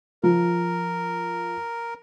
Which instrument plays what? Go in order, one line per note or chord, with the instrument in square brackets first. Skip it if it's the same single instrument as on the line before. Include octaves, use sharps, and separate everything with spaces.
[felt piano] F3 [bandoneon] A#4